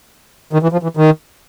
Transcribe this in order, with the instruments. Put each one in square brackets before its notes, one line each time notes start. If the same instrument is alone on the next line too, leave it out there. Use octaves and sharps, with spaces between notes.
[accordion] D#3
E3
F3
E3
D#3